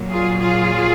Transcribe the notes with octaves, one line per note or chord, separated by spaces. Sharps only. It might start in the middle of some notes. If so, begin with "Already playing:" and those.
Already playing: A#2 F#3
F4 G#4
F4 G#4